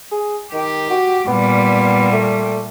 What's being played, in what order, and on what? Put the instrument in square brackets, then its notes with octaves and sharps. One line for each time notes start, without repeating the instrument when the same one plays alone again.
[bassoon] G#4
[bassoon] D#3 [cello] G4
[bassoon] F#4
[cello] A#2 G3 [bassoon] B3
[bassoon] A3